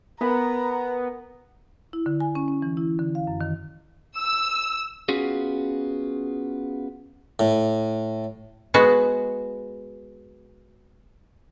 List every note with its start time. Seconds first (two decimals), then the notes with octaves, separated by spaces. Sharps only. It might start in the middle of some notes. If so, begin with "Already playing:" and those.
0.21 B3 A#4 G#5 A#5 B5
1.93 E4
2.06 D3
2.20 G#5
2.35 C#4
2.48 C#4
2.62 E3
2.77 E4
2.99 D3
3.15 F5
3.27 F#2
3.41 D#3
4.19 E6
5.09 B3 C#4 F4 F#4 G#4
7.39 A2
8.74 G#3 B3 F#4